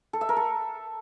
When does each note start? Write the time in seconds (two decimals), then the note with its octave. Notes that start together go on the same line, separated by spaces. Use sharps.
0.13 A4
0.21 E5
0.29 A#4
0.37 A4